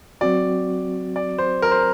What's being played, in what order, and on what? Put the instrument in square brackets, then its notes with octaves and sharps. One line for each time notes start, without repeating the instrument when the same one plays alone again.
[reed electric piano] F#3 C4 F#4 [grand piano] D5
[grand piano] D5
C5
A#4
C5